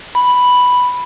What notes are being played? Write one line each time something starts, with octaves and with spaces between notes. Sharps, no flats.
B5